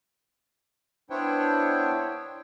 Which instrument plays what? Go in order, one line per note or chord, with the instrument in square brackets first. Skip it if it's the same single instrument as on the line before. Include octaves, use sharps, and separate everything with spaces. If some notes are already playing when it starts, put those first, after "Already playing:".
[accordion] B3 D4 E4 C5 C#5 G5